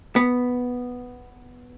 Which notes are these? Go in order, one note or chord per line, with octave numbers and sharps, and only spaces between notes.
B3